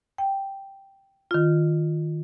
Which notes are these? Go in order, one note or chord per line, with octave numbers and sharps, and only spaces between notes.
G5
D#3 F4